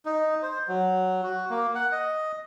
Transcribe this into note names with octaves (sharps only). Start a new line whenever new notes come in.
D#4
C5
F#3
F#4
A#3
F#5
D#5